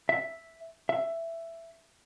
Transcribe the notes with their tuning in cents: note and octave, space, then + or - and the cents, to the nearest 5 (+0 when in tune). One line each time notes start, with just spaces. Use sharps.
E5 +0
E5 +10